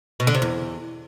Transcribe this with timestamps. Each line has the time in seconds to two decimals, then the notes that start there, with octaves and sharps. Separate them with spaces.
0.20 B2
0.27 D3
0.35 C3
0.42 E2